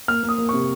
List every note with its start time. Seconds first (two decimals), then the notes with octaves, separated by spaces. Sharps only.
0.08 A#3 F6
0.23 A#3
0.29 D#6
0.38 A#3
0.49 C3 C#6